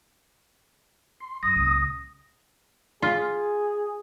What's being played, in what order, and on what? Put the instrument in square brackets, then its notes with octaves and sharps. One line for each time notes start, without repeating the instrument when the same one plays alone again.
[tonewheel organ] C6
[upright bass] F#2 [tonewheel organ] D#6 [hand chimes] A#6
[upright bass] C#2 A#2
[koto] F4 [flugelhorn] G#4